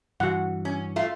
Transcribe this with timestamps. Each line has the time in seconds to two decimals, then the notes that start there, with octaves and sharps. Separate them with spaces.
0.20 G2 E3 F#4 F#5
0.65 C#4
0.96 A3 F4